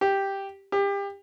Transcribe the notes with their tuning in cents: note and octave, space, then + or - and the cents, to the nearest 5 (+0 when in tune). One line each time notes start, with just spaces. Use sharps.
G4 +0
G4 +30